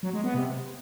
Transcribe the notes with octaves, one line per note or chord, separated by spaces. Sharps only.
F#3
G#3
B3
C3